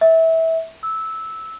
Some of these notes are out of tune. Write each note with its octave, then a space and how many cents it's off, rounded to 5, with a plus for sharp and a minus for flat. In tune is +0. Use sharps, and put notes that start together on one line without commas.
E5 -20
E6 -15